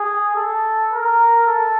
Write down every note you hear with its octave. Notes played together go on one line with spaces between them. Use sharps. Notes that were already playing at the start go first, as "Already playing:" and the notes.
Already playing: G#4
A4
A#4
A4